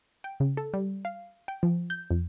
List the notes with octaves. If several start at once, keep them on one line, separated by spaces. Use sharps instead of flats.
G5
C#3
A4
G3
F5
G5
F3
G6
F2